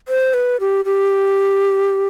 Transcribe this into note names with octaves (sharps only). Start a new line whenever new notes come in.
C5
B4
G4
G4